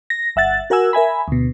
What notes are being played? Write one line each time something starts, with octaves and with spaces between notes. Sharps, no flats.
A#6
G1 E5 F#5 A6
F#4 A#4 F#5 G#5 E6
A#4 E5 G#5 B5
D2 B2